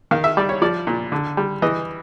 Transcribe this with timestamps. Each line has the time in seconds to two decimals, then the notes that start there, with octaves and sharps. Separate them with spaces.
0.11 D#3 F5
0.24 E5
0.37 G3 D5
0.49 C#5
0.62 F3 D5
0.87 A#2
1.12 D3
1.37 G3
1.62 E3 D#5